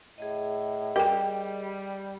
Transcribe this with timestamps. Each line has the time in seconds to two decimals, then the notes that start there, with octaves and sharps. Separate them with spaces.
0.18 A2 G#4 D#5
0.96 G3 G4 A#4 G5